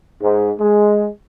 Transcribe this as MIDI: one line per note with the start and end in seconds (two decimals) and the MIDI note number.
0.22 0.50 44
0.60 1.06 56